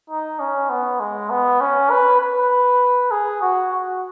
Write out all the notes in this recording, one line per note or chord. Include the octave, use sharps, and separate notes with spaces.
D#4
C#4
B3
G#3
B3
C#4
B4
B4
G#4
F#4
F#4